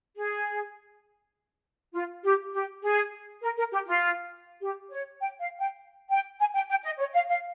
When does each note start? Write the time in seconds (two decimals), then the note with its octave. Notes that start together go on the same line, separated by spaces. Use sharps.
0.16 G#4
1.94 F4
2.24 G4
2.53 G4
2.83 G#4
3.42 A#4
3.57 A#4
3.72 G4
3.87 F4
4.61 G4
4.91 C#5
5.21 G5
5.40 F5
5.60 G5
6.10 G5
6.40 G#5
6.54 G5
6.70 G5
6.84 D#5
6.99 C#5
7.14 F5
7.29 F5